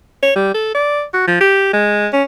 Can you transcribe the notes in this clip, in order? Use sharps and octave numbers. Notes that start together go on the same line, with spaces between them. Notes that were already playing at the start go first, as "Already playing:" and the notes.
C#5
G3
A4
D5
F#4
F3
G4
G#3
C#4